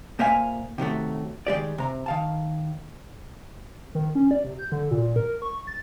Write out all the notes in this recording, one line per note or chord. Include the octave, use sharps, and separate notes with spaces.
A#2 A#3 C5 E5 F5 G#5
C3 D#3 F#3 A3
D#3 G#3 G4 D5
C3 A#5
D#3 F5 A5
D#3
C#4
D5
C3
G6
D3
A#2
A#4
C#6
A6